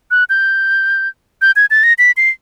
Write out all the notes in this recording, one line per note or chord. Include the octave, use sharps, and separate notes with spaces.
F#6
G6
G6
G#6
A6
A#6
B6
C7